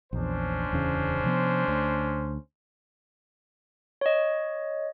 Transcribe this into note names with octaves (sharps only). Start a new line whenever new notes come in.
A#1 E2 C#4 D4 C5
D1 E2 C#3
C3 F3 B3
D2
C#5 D#5